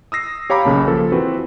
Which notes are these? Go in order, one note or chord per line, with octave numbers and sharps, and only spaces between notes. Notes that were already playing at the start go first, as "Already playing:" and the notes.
D#6 E6 A#6 C7
G4 C#5 F5 A#5 B5 D6
B1 C#3 A#3 A5 B5
F3 A#3 A4
E3 C4 F#4 B4